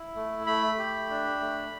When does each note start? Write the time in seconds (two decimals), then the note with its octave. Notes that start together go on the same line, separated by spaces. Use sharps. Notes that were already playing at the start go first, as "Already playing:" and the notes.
Already playing: E4
0.15 A3
0.47 A3 B5
0.78 G4
1.10 D4
1.41 A3